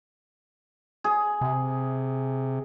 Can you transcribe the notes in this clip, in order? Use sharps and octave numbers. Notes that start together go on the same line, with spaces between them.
G#4
C3